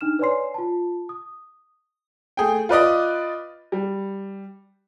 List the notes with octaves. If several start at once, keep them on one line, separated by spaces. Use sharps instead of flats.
D4 D#4 F6 E7
B4 C#5 D5 G#5 C6 C7
F4 A5
D#6
A3 G#4 G5
F4 B4 D5 D#5
G3